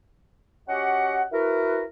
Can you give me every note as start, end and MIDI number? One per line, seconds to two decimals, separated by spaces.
0.68 1.23 61
0.68 1.23 66
0.68 1.23 67
0.68 1.23 75
0.68 1.23 78
1.32 1.83 64
1.32 1.83 66
1.32 1.83 70
1.32 1.83 71